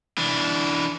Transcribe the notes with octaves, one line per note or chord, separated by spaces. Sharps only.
E3 D4